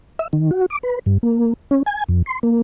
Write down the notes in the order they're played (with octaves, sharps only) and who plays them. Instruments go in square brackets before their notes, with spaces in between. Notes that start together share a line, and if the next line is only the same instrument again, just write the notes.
[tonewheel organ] E5
D#3
F#4
D6
B4
G2
A#3
C#4
G#5
F2
C6
A#3